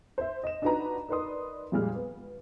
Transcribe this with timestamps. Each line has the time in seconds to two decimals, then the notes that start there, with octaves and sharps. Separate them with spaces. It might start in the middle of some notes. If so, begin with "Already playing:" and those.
0.18 C5 E5
0.43 D#5 E7
0.62 D4 D#4 F4 F#4 B4 A#5
1.08 D#4 A#4 B4 D5 C6 D#6
1.72 F2 A#2 G3 G#3 F6
1.95 B3